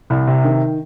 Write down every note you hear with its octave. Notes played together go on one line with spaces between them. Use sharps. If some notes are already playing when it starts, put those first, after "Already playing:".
C2
C3
D#3